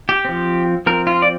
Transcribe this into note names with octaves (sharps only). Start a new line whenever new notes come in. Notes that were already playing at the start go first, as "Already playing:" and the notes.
G4
F3 C4
F3 C4 A#4
F4
D5